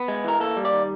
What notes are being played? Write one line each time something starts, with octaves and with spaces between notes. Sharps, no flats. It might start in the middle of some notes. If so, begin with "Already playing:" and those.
Already playing: B3
G#3
E3 A#4
A#3 A4
G3
D5
D#3